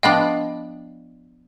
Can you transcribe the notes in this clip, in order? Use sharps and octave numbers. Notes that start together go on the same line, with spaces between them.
F3 B3 D4 D#5 F5 G5